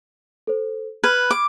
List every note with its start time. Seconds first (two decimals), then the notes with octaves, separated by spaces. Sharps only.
0.47 A4 C5
1.04 B4 B5 F6 G#6
1.31 D6